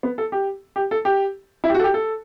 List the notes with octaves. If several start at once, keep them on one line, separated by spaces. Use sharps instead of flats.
B3
A4
G4
G4
A4
G4
E4
G4
F#4
A4
G4
A4